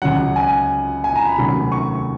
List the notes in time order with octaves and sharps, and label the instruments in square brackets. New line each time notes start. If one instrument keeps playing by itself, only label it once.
[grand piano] C#2 C#3 F#3 F#5
G#5
G#5
A#5
B5
F1 D#2 C#3 F#3
C#6